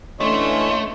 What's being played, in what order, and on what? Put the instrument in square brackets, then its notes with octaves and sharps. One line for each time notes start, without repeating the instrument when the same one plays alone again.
[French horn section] D3 E3 C#4 [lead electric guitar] A3 [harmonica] C#5 D#5 [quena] C6